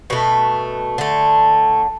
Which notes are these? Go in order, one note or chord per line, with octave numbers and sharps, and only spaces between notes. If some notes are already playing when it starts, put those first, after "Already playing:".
B2 A3 B4
D3 A3